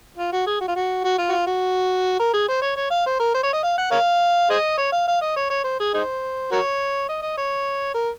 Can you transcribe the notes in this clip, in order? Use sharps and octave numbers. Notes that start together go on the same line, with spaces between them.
F4
F#4
G#4
F#4
F4
F#4
F#4
F4
F#4
F4
F#4
A#4
G#4
C5
C#5
C#5
F5
C5
A#4
C5
C#5
D#5
F5
F#5
A#4 C#5 F5
G#4 C5 D#5
C#5
F5
F5
D#5
C#5
C#5
C5
G#4
D#4 G#4 C5
F#4 A#4 C#5
D#5
D#5
C#5
A#4